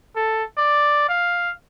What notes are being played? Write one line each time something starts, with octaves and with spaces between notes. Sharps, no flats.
A4
D5
F5